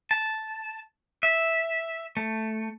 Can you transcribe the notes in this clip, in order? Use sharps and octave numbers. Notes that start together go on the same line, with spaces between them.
A5
E5
A3